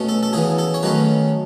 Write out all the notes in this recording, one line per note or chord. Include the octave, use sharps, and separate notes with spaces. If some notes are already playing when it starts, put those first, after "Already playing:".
Already playing: B2 A3 C#4
A4
A4
C#3 E3 B3 G#4
A4
C#5
D#3 F#3 A3 C#4 B4